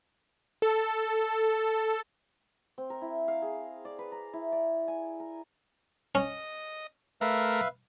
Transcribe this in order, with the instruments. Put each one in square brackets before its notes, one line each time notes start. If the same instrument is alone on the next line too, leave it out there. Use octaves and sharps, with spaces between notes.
[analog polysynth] A4
[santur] C4
A#4
E4
F5
G#4
D5
B4
A#5
E4
D5
G#5
A#4
[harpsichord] C#4 [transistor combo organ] D#5
[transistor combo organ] A3 A#4 [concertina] B4 E5 F5